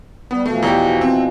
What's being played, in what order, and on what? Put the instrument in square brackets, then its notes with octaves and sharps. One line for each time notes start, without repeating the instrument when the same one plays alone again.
[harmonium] G3 [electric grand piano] B3
[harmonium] B2 E3 F3 [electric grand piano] A3
[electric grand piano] E2 G4
C4